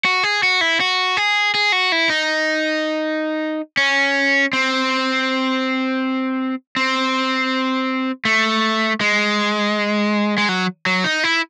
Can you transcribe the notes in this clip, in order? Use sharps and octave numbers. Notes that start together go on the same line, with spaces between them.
F#4
G#4
F#4
E4
F#4
G#4
G#4
F#4
E4
D#4
C#4
C4
C4
A3
G#3
G#3
F#3
F#3
D#4
E4